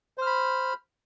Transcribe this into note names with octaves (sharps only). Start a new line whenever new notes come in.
C5 B5 F6